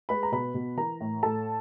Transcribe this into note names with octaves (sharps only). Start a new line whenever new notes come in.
G#3 B4 B5
A#5
B2 B4 B5
B2
E3 A#4 A#5
A2
A2 A4 A5